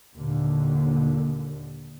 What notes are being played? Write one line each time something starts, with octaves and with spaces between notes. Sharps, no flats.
D#2 A#2 D3